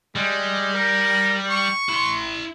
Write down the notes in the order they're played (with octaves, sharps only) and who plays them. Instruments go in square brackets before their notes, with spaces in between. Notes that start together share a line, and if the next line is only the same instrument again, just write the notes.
[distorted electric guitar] G3 [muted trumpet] G#3
[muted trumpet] A#4
C#6
[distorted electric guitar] E4 C6